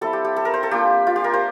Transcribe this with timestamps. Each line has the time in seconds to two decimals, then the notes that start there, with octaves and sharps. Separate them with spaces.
0.01 G3 C4 E4 A4
0.13 G4
0.25 G4
0.36 A4
0.45 A#4
0.54 C5
0.63 A4
0.71 A#3 D4 F4 G4
1.07 F4
1.16 G4
1.24 A#4
1.34 C5